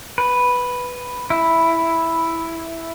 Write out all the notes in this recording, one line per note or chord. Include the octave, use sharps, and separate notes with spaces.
B4
E4